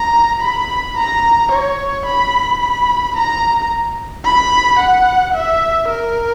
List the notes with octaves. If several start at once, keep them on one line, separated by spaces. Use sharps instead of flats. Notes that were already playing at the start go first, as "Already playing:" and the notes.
Already playing: A#5
B5
A#5
C#5
B5
B5
A#5
B5
F#5
E5
A#4